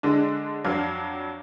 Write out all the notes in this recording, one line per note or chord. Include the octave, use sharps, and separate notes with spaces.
D3 G#3 D4
F2 F#3 D4 F5